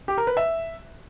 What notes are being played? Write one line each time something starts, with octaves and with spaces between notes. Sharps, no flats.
G4
A#4
B4
E5